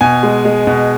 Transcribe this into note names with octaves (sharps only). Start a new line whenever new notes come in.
B2 G#5
G#3
G#3
B2